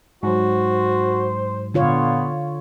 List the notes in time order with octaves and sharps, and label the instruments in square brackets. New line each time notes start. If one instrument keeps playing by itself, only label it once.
[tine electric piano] G#2 F#3 [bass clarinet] F#4 [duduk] C5
[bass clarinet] A#2 [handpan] D3 F4 C#5 [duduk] B3